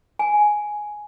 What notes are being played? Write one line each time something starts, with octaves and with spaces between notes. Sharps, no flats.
G#5